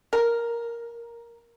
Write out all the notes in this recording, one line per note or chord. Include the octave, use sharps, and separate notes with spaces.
A#4